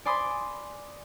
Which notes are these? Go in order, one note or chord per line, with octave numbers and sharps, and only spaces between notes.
D5 G#5 B5 C6 D6 D#6